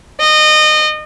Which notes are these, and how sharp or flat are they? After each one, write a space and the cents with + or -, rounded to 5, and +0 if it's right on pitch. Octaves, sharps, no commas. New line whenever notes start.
D#5 -25